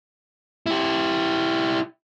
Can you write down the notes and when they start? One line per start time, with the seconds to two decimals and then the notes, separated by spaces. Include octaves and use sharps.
0.66 E4 G4